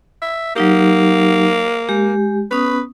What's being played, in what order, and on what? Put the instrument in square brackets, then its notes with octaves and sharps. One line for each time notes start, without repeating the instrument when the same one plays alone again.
[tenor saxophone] E5
[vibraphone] F#3 D#4 G4 [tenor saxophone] A#3
[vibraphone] G#3 G4
[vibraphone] B3 C#4 D#6 [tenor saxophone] B4